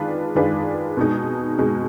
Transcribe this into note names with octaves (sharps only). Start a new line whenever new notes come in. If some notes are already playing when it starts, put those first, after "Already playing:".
Already playing: D#3 G#3 D4 F4 B4
D#3 G#3 D4 F4 B4
B2 G#3 D#4
B2 G#3 D#4